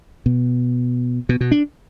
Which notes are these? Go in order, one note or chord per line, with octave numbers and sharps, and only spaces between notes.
B2
B2
B2
D4